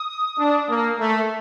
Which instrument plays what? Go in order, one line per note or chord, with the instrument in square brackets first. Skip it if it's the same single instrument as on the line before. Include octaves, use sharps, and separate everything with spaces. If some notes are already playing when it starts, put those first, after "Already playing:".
Already playing: [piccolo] D#6
[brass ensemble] D4
A#3
A3